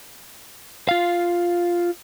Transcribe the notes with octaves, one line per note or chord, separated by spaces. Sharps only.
F4 F5